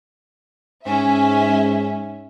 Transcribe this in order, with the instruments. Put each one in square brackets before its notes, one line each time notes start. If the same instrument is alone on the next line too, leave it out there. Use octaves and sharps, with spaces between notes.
[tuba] G#2 [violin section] C#4 E5